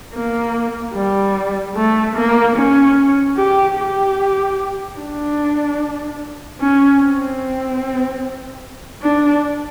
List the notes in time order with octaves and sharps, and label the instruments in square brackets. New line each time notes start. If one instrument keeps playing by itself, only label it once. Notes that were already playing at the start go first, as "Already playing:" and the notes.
[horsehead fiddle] A#3
G3
A3
A#3
C#4
G4
G4
D4
C#4
C4
D4